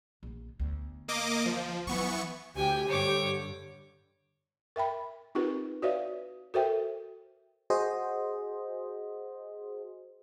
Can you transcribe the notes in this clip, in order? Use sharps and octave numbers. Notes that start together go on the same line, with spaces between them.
A#1 D#3
D2 B3
A#3 D#5 D6
F3
E3 F#3 B3 C#4 C#6
D2 G4 G5 G#5
G2 D3 C#5 D6
A#4 E5 G5 B5
C4 D#4 F4 G4 A#4 B4
F#4 B4 C#5 D5 E5 F5
F#4 A4 A#4 C5 E5 G5
F#4 G#4 C5 D#5